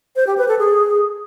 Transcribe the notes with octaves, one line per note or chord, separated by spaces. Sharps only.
C5
G4
B4
A4
G#4